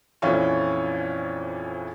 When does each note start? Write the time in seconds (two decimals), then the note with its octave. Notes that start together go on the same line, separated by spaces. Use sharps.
0.22 A#1 F2 E3 C#4 F5 C#6